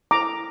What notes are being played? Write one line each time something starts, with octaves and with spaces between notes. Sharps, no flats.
E4 A4 C5 A#5 D6